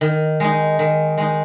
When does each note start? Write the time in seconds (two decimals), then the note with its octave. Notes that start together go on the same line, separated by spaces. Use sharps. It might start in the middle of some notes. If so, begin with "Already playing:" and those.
0.01 D#3
0.40 G#3 D#4
0.79 D#3
1.18 G#3 D#4